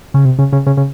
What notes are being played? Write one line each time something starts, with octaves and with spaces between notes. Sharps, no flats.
C#3
C3
C#3
C#3
C#3
C#3